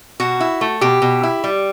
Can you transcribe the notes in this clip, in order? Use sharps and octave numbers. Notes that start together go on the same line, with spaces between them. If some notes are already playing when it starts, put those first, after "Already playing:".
B2 F#4
E4
A3
B2 G4
B2
E4
G3